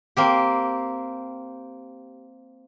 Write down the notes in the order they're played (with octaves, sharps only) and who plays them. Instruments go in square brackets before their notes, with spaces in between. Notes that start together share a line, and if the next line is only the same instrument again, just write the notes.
[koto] A#3 C4 G4